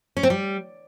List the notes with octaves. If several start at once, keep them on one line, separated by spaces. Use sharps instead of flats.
C#4
C4
G3